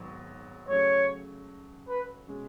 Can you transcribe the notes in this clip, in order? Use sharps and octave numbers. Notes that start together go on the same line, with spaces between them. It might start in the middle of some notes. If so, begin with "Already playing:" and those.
Already playing: G#1 G#2 F#3 B3
C#3 F#3 A3 C#5
B4
B2 G#3 C#4